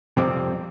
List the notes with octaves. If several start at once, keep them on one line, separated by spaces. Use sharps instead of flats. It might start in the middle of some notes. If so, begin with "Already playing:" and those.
F2 C3 G3 C4